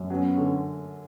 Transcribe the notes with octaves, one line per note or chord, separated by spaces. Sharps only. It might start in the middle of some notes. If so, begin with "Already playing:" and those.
Already playing: F#2
F#3 B3 C#4
D3